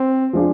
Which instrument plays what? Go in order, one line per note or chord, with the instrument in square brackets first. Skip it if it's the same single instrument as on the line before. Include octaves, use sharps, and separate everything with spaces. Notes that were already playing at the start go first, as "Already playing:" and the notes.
Already playing: [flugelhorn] C4
[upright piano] F3 G#3 D4 F4